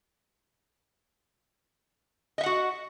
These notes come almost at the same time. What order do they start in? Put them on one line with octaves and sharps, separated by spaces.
D#5 E5 F#5 F#4